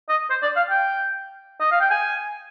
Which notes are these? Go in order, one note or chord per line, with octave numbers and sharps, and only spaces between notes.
D#5
C5
D5
F5
G5
D#5
F5
G5
G#5